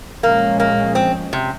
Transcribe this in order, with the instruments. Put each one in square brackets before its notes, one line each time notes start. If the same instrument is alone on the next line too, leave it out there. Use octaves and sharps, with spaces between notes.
[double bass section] A#2 F3 G#3 C#4 [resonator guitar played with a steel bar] A#3
[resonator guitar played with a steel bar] A#3
C4
C3